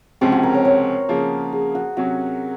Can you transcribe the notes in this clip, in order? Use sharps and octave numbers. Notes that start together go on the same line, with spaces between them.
C#2 C3 F3 G#3 C4 C#4
F#4
A#4
C#5
C#5
C#3 F3 A#3 G#4
G#4
F#4
C3 F#3 C#4 F#4